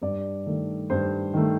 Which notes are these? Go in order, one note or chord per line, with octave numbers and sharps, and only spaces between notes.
G2 D5
D#3 A3
G2 C5
D#3 A3